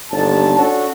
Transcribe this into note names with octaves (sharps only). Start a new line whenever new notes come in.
G1 D#2 A5
C#4 D4 F#4 A4